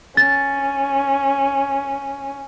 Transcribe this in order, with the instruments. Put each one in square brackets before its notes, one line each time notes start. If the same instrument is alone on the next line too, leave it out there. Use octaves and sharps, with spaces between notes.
[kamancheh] C#4 [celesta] A6